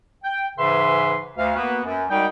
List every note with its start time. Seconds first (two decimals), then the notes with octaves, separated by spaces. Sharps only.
0.23 G5
0.58 G#2 C#3 E3 B4 E5 C6
1.37 D2 F5
1.56 A#3 B3 F#4 B4
1.84 F#2
2.10 C2 G3 G#3 D#4 F#4 G5